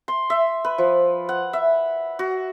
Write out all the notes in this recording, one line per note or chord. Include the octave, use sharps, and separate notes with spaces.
C6
E5
B4
F3
F#5
E5
F#4